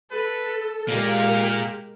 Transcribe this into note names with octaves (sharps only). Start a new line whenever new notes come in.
A4 B4
A#2 G#3 A#3 G4 A#4 F6